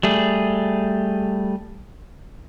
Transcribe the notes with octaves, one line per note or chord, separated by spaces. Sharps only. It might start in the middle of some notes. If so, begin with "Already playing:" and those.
G3 A3 G#4